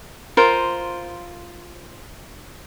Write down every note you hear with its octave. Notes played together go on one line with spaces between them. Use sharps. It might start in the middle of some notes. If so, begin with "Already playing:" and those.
F4 A#4 C5